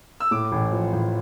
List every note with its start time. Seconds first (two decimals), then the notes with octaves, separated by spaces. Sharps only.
0.20 E6
0.31 A2 D6
0.52 A1
0.72 F3
0.93 A1